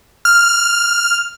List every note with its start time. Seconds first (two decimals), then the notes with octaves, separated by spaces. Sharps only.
0.25 F6